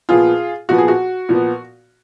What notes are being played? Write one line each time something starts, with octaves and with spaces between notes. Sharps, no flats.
A#2 F3 B3 F4 G#4
A#2 F3 B3 F#4
G#4
F#4
A#2 F3 B3